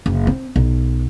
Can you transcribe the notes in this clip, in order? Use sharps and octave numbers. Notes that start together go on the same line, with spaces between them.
F#1
C4
B1